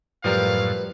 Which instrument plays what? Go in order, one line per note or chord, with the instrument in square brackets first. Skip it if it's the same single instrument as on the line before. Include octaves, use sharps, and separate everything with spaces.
[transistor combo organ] F#2 A2 [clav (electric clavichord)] F3 G3 A#4 [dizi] B4 [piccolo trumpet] F5